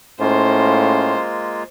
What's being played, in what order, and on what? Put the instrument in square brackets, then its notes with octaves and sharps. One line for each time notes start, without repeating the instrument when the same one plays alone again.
[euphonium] A2 [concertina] G#3 A#3 F4 [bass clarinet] C#4 [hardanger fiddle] C5